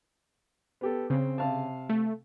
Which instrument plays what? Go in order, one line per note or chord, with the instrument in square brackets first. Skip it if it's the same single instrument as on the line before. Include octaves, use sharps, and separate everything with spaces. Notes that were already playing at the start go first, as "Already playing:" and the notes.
[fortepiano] B3 G4 A4
[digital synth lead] C#3 [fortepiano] C4
[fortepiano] C3 F5 A5
[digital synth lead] A3